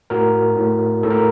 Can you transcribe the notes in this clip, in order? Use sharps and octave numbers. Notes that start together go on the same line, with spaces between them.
A2 F#4 A#4
A2
A2 A4
A#4